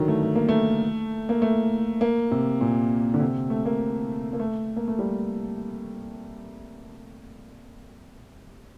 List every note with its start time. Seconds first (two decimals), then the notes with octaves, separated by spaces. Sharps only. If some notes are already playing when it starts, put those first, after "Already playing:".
Already playing: D3 D#3 F#3
0.08 A3
0.23 A3
0.35 A#3
0.49 A3
1.29 A#3
1.42 A3
2.01 A#3
2.31 C3
2.61 A#2
3.14 D3
3.20 C3
3.50 A3
3.66 A#3
4.33 A#3
4.40 A3
4.76 A#3
4.88 A3
4.99 G3